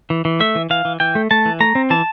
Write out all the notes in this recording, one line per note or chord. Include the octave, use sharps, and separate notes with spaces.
E3
E3
A3 E5
E3
E3 F5
E3
E3 G5
A3
A3 A5
E3
A3 A#5
C4
E3 A5